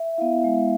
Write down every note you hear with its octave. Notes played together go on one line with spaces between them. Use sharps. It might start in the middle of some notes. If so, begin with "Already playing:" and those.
Already playing: E5
B3 E4 F5
G#3